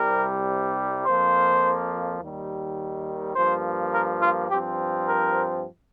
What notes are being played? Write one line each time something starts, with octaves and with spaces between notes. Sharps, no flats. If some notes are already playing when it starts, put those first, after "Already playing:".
Already playing: C2 C3 G3 A#4
F2 F3 A#3 C5
D#2 D#3 G3
G2 F3 A#3 C5
A#4
F4
G2 F3 C4 G4
A#4